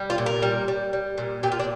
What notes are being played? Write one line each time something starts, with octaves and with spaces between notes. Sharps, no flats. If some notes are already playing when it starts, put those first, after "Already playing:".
Already playing: G3
F4
A#2
A#4
G3
G3
G3
A#2
A#2 G4
F4
D4